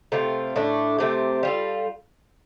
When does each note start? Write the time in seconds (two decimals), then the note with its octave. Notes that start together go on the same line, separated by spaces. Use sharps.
0.12 C3 A3 C4 F4
0.56 A2 A3 D4
0.98 C3 A3 C4 G4
1.43 G3 F4 A4